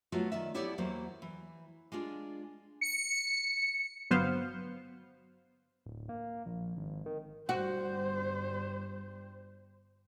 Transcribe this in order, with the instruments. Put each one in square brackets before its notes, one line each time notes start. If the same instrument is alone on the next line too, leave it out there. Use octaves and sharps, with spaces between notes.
[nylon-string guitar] F#3 A3 B3 F4 F#4
D#3 D5 E5
B3 E4 G4 A4 C#5 D5
E2 F#3 A#3 C5
E3
G#3 D4 F4 G#4
[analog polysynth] C#7
[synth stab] G1 F#3 B3 C5 F5
[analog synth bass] D1
A#3
A#1
G#1
D#3
[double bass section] G1 G3 [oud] F#4 [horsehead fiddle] C5